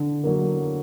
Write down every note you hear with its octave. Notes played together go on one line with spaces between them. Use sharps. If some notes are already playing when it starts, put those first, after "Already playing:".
Already playing: D3
F#3 A#3